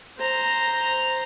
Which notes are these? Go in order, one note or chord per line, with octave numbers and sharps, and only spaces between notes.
C5 A#5